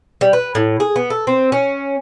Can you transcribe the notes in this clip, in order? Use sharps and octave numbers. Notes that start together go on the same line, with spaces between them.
G3
B4
A2
G#4
B3
A4
C4
C#4